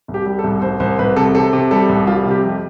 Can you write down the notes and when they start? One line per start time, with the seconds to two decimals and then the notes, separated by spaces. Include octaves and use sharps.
0.08 C2
0.14 G4
0.26 G3
0.39 A4
0.44 C2
0.62 C2 C5
0.80 C2 C5
0.99 C2 B4
1.16 C3 A4
1.35 C3 A4
1.53 C3
1.71 G3 A4
1.89 C2
2.07 G3 F4
2.26 C3
2.31 G4
2.43 F2